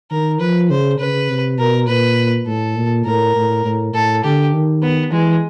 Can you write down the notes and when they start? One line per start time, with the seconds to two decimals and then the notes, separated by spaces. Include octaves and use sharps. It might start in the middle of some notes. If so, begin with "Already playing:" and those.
0.11 D#3 A#4
0.40 F3 B4
0.70 C#3 C5
0.99 C#3 B4
1.29 C3
1.58 B2 A#4
1.88 A#2 B4
2.47 A2 A4
2.77 A#2
3.06 A2 A#4
3.36 A2
3.65 A2
3.94 A2 A4
4.24 D3 G4
4.53 D#3
4.83 B3
5.12 E3 G#3